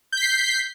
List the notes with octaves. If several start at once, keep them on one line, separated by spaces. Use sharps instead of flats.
G6 B6 C7